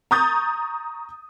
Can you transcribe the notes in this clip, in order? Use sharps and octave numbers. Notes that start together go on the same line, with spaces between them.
A#5 C#6 D#6 G6 A6